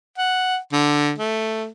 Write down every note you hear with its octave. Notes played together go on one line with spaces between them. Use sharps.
F#5
D3
A3